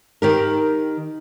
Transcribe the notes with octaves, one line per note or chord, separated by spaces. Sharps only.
D#3 G4 A#4